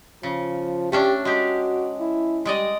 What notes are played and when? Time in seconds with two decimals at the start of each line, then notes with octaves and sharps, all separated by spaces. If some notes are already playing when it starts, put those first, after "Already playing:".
0.23 C#3 F3
0.92 A3 C#4 D4 G4
1.25 G#3 F#4 G4
2.00 E4
2.45 G3 G#3 D5 D#5